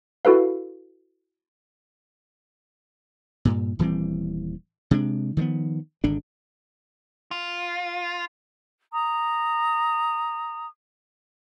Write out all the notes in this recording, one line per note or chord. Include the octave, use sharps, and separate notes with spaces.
E4 F#4 A4 B4 F5
G2 A#2
D#1 E3 G3 C4
C3 G#3 D4
D#3 F3 G3 B3
G#1 D3 D4
F4
A#5 D#6